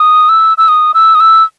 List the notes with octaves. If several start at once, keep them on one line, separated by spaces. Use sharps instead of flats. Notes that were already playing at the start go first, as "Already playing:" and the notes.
Already playing: D#6
E6
E6
D#6
E6
D#6
E6